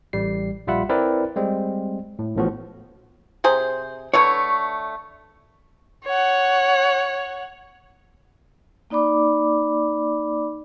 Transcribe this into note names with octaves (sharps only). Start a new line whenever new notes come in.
A1 G3 C7
A#1 G3 F4 E5 F#5 B5
C4 E4 A#4 B4 D5
G3 G#3 C4
A2
A1 A2 F3 B3 F#4
C3 G#4 C5
D3 A3 B4 C#5
C#5 F#5
A#3 D#4 D5 B5 D6